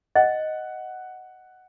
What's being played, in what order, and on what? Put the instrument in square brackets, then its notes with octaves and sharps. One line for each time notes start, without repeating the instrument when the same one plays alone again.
[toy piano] D#5 [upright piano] F#5